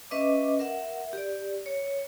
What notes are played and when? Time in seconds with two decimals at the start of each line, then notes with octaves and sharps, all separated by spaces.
0.11 C#4 B4 D#5 E5 D6
0.59 A#4 E5 F#5
1.13 G4 D5
1.66 C#5